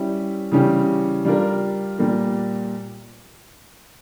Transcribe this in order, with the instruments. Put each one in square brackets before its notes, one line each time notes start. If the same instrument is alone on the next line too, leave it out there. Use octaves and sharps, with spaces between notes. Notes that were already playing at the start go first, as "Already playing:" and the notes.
Already playing: [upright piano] G3 C#4 E4
C#3 E3 G3 C#4 G4
G3 D4 F4 A#4
A#2 G3 A#3